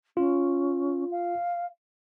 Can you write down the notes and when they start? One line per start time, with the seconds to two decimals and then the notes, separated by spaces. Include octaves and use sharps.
0.17 C#4 F4
1.11 F5